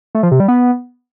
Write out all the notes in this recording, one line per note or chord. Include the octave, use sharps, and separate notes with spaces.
A3
F3
C3
G3
B3